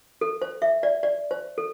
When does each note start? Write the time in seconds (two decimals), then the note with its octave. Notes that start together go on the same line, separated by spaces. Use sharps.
0.21 A4
0.42 C5
0.62 E5
0.83 D5
1.03 D5
1.31 C5
1.58 A4